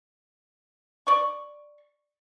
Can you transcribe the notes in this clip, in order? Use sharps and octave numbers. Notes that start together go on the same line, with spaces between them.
D5 C#6